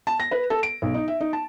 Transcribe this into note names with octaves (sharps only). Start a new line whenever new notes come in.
A5
A#6
B4
A4
D7
B1
D#4
E5
D#4
A5